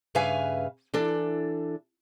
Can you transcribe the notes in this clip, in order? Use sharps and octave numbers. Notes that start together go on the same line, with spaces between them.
G2 C#3 B4 E5 F5 G#5
E3 D4 A4